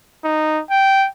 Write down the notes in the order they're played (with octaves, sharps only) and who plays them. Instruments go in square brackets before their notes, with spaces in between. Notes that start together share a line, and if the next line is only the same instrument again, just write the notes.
[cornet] D#4
G5